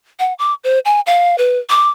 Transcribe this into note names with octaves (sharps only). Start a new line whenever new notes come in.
F#5
D6
C5
G#5
F5
B4
D6